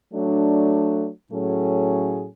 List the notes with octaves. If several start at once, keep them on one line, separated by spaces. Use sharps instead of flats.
F#3 A3 D4
A2 F#3 A3 C#4 G#4